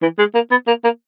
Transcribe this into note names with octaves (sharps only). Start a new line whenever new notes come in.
E3
G#3
A#3
B3
A#3
A#3